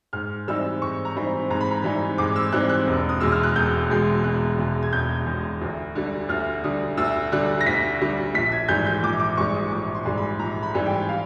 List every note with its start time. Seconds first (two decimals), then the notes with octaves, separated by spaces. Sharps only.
0.13 G#2 F6
0.48 E3 G3 C4 D#4 E6
0.82 G#2 C#6
1.05 A#5
1.16 E3 G3 C4 D#4 B5
1.50 G#2 A#5
1.61 B5
1.71 A#5
1.84 E3 G3 C4 D#4
2.18 G#2 D6
2.36 E6
2.52 E3 G3 C4 D#4 F#6
2.69 F#6
2.87 E1
3.09 D#6
3.21 E2 B2 G#3 E6
3.32 F6
3.43 F#6
3.56 E1 G6
3.90 E2 B2 G#3
4.24 E1 F#6
4.58 E2 B2 G#3
4.83 G#6
4.93 E1 G6
5.26 E2 B2 G#3
5.61 D2
5.95 D3 G3
6.29 D2 F6
6.64 D3 G3 D#6
6.97 D2 E6
7.32 D3 G3 F#6
7.61 A#6
7.66 D2 B6
8.01 D3 G3
8.35 A#1 B6
8.52 G#6
8.68 G#2 E3 G3 G6
8.86 G6
9.03 A#1 D6
9.20 D6
9.37 G#2 E3 G3 C#6
9.55 D#6
9.71 A#1 D6
9.95 C6
10.05 G#2 E3 G3
10.17 B5
10.39 A#1 A#5
10.63 B5
10.75 G#2 E3 G3
10.86 G5
11.09 F5